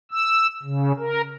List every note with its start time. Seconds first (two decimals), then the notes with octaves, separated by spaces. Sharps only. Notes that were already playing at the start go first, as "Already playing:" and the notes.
0.11 E6
0.63 C#3
0.99 A#4